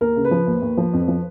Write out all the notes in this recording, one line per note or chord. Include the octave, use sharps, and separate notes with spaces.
D#2 A#4
C#3
B4
F3
D#2
D#2
F3
F2
F3